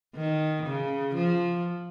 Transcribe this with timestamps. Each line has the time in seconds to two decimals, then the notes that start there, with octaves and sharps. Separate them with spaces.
0.15 D#3
0.66 C#3
1.15 F3